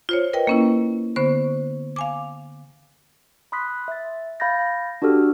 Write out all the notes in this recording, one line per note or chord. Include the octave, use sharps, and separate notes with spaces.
F4 C5 C#5
A#4 B4 D#5 G5
A#3 C#4 E4
D3 B3 C5 C#6
F5 G#5 D6
B5 C6 D#6 F#6 B6
E5 A6
F5 B5 G6 A6 A#6
D4 F#4 G4 A4 F6